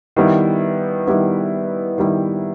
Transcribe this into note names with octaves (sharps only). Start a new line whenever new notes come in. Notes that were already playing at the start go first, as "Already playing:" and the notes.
D#3 G3 B3 E4
D#3 G3 B3 E4
D#3 G3 B3 E4